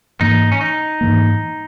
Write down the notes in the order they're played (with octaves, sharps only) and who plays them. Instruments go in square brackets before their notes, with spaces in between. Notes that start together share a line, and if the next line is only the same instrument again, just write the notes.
[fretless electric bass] G#2 E3 A#3 [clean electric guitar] D#4
[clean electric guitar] C#4
D#4
[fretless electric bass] G#2 E3 A#3